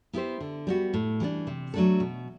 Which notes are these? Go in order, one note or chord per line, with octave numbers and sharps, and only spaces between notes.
B3 E4 G4 C5
D3
G3 B3 F#4
A2
E3 G3 B3 D4
C3
F#3 A3 D4 A4
B2